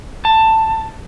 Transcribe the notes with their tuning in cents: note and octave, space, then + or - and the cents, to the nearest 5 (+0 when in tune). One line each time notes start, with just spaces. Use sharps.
A5 +15